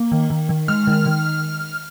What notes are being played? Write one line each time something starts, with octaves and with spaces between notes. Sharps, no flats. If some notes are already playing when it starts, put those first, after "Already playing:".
Already playing: A#3
D#3
D#3
D#3
G#3 F6
D#3
D#3